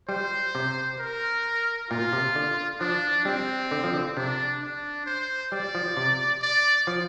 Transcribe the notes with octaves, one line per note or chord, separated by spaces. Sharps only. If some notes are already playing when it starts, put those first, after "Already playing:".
G3 C5
C3
A#4
A#2 F4
C3
D3
F3 D4
G3 C4
D3
F3
D3
C3 D4
D4
C5
G3 D5
F3
C3
D5
F3